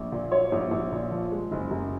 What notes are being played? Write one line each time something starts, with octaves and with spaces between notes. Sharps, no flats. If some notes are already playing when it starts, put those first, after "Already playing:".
Already playing: A#1
A#2
F#3 C#5
A#1
A#1
A#2
F3
G#3
F#1
F#2